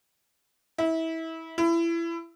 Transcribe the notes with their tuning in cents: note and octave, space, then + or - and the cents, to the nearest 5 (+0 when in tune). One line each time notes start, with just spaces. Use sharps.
E4 -25
E4 +25